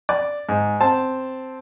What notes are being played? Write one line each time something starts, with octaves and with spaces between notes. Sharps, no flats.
D5
G#2
C4 A5